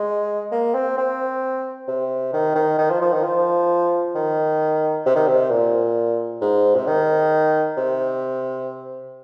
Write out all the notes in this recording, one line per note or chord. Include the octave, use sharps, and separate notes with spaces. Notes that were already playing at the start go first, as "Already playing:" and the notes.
Already playing: G#3
A#3
C4
C4
C3
D#3
D#3
D#3
F3
F3
D#3
F3
D#3
C3
D#3
C3
A#2
G#2
C3
D#3
C3